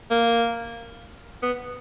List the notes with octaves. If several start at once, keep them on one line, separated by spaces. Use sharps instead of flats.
A#3
B3